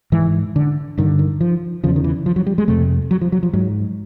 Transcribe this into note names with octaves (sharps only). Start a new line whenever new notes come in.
G#2 E3
D3
G2 D3 D#3
D#3
F3
E2 C#3 F3
D#3
E3
F3
F#3
G3
G#3
F2 C3 A3
F#3
F3
F#3
F3
G#2 F#3